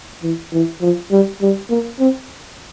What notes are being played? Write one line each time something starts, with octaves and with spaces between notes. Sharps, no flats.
E3
E3
F3
G3
G3
A#3
C4